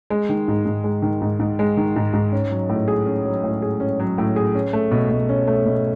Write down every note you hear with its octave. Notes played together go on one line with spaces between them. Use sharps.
G#3
D#3
G#2
G#2
G#3
D#3
G#2
G#2
G#3
D#3
G#2
G#2
C#4
F#3
A2
G#4
C#4
F#3
A2
G#4
C#4
F#3
A2
G#4
C#4
A3
B2
B2
C#4
A3
B2